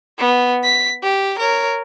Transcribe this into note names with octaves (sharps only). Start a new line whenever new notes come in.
B3
B6
G4
A#4 C#5